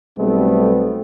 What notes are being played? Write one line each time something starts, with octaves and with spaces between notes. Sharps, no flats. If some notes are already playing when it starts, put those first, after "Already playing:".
B1 G3 A3 B3 C4